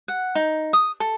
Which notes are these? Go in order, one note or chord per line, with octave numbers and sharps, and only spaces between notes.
F#5
D#4
D#6
A4